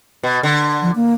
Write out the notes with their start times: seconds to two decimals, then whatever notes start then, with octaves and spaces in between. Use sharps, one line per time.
0.23 B2
0.43 D3
0.82 F3
0.95 A#3